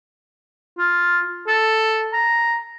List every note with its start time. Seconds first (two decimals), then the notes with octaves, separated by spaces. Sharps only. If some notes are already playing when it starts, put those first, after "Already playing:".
0.78 F4
1.47 A4
2.13 A#5